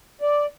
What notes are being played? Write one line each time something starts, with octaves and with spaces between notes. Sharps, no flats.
D5